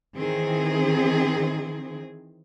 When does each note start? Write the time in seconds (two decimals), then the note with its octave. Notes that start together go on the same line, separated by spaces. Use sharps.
0.16 D#3 E3 C4 G#4